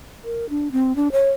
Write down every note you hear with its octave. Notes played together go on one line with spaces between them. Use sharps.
A#4
D4
C4
D4
C#5